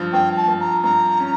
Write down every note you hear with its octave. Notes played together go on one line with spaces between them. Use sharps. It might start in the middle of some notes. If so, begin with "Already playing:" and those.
Already playing: G2 F3
G2 G5
A5
G2
A#5
G2 A#5
C#4